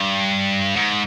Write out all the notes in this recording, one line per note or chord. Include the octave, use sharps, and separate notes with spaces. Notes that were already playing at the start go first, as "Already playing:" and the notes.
Already playing: G2
G#2